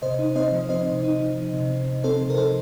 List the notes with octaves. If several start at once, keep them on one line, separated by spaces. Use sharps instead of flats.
C3 C5 D#5
D#4
C4 C5 D#5
F3
C4 C5 D#5
C3
D#4
F3
D#4
C3
C4
C3
C4 A4 C5
C3
A#4
F3 A4 C5